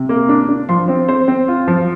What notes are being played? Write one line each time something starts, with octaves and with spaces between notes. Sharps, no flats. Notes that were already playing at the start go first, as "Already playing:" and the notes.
Already playing: C3
A#3
D4
D4
F3 C6
C4 C5
C4 C5
C4
F4
F3